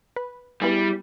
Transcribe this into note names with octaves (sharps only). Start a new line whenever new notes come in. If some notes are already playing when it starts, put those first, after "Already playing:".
B4
G3 B3 E4 G#4